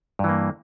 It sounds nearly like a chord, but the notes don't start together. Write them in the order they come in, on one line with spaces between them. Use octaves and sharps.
G2 E3 A#3